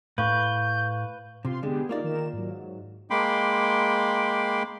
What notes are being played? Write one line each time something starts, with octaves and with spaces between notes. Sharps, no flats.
A2 B4 F5 C#6 G6
C3 F4 F5 C6
D3 G#3 B3 G4 G#4
A#3 D#4 F4 A#4 D5
D#3 A#4 E7
G#2 F#3
G#3 A#3 G5 B5 C6 D6